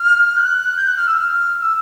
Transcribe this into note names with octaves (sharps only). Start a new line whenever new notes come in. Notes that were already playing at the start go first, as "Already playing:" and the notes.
Already playing: F6
G6
F#6
G6
F#6
F6
E6
F6
F6
E6